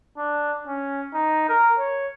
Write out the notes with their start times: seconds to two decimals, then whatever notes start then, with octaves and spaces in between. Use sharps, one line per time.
0.17 D4
0.67 C#4
1.14 D#4
1.49 A#4
1.78 C#5